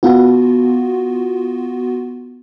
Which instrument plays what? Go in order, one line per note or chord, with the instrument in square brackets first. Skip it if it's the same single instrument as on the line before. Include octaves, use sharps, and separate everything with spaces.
[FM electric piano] B3 F4 F#4